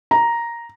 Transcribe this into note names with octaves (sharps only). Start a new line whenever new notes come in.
A#5